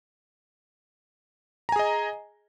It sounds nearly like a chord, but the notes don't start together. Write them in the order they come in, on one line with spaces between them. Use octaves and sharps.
A#5 G#5 G#4 D#5